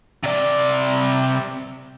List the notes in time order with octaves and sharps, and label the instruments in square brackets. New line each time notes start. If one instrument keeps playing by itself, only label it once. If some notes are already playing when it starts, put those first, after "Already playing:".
[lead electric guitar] C3 D5